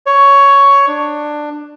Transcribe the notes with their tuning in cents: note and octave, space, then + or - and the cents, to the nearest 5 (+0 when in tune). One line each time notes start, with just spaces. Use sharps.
C#5 +10
D4 +15